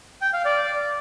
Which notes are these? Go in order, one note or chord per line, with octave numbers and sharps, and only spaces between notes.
G5
F5
D5